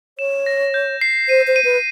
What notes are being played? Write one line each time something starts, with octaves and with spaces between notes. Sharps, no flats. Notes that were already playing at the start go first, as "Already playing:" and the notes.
C#5 E7
A#6
G6
C7
C5 D#7
C5
D#7
B4